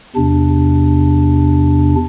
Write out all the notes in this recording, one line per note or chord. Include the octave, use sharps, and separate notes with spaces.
E2 C3 D4